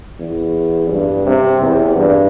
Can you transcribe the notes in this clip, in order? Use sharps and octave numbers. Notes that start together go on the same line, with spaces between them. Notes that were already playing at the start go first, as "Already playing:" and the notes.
E2
G2
C3
E2
G2